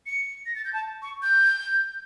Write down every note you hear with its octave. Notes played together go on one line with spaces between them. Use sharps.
C#7
A#6
A6
G6
A5
C#6
G6